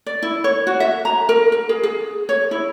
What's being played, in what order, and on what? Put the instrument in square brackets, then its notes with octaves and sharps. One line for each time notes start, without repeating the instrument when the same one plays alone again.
[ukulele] D5
E4
C#5
F#4
E5
A#5
A#4
A#4
G#4
G#4
C#5
E4